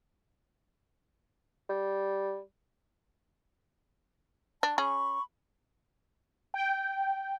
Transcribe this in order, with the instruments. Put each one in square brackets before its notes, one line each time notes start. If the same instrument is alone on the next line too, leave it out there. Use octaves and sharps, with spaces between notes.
[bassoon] G3
[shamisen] D4 [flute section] A5
[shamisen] C#4 G#4 [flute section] B5 C#6
[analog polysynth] G5